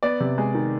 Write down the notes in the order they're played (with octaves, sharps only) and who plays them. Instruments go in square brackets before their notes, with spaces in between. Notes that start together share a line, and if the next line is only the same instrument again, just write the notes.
[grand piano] B3 D5
C3
G#3
D#3